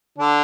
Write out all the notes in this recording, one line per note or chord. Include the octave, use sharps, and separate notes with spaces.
D3 D4